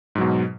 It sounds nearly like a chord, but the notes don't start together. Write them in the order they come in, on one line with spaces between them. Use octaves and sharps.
G#2 F#3 B2